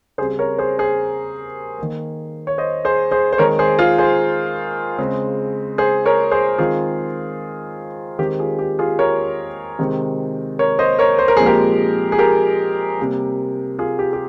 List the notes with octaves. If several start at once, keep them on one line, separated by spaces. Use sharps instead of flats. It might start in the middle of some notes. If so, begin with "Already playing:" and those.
C#3 G3 C4 G#4 C5
A#4 C#5
G#4 C5
G#4 C5
D#3 A#3
C#5
C5 D#5
G#4 C5
G#4 C5
C5
D#3 G#3 C4 A#4 C#5
G#4 C5
F4 G#4
G#4 C5
C#3 G#3 C4
G#4 C5
A#4 C#5
G#4 C5
D#3 G#3 C4 F4 G#4
D#3 G#3 C4 G4
F4 G#4
G4
F4 G#4
A#4 C#5
C3 D#3 G#3 C4
A#4 C#5
C5 D#5
A#4 C#5
C5
A#4
A#2 F3 G#3 C4 G#4
G4 A#4
G#4
G4 A#4
C3 G3 A#3
F4 G#4
G4
G4